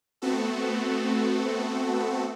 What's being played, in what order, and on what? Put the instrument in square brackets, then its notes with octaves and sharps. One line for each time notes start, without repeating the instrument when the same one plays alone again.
[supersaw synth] A3 B3 C4 F#4 A4